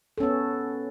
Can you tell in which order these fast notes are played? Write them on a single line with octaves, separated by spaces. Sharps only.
A4 C#4 B3